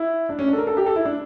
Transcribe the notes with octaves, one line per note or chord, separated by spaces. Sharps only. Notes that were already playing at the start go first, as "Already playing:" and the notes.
Already playing: E4
D4
C#4
D4
A4
A#4
A4
G4
A4
E4
D4